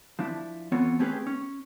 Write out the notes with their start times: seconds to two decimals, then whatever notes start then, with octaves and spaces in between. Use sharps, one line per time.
0.19 F3 D4 E4
0.72 E3 B3 C4 F4 A4 C#5
0.99 A3 C4 C#4 G4 G#4 B4
1.27 C#4